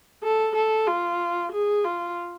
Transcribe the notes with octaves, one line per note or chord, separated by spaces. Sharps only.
A4
A4
F4
G#4
F4